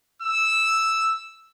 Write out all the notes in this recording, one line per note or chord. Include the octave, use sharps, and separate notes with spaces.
E6